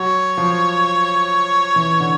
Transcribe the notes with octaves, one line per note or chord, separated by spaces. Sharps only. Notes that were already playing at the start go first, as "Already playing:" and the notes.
Already playing: F#3 C#5
F3
E3
D3